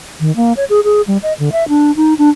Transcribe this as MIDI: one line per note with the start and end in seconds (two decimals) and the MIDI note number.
0.20 0.34 51
0.36 0.53 58
0.57 0.65 73
0.70 0.80 68
0.84 1.02 68
1.07 1.18 55
1.23 1.33 75
1.39 1.50 50
1.52 1.67 76
1.69 1.94 62
1.96 2.14 63
2.18 2.29 62